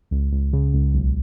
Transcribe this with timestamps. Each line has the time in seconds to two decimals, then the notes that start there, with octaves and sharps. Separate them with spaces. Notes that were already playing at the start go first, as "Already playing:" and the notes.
0.11 C#2
0.32 C#2
0.53 C#3
0.74 C#2
0.94 B1